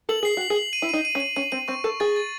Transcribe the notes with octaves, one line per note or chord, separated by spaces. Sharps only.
A4 F#7
G#4 C7
F#4 F#7
G#4
F#7
D#7
E4
D#4 D#7
D#7
C#4
D#7
C#4 D#7
C4 D#7
C4 C#6
A4 C#6
G#4 A6
A6